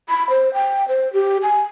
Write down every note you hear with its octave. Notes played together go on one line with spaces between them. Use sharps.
B5
C5
G5
C5
G4
G#5